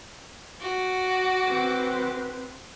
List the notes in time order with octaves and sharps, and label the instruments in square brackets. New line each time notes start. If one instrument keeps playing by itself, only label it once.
[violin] F#4 D6
[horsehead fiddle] C4 B4